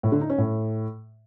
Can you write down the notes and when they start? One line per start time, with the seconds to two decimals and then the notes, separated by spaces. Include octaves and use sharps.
0.03 A2
0.12 D3
0.21 D#4
0.29 C#4
0.38 A2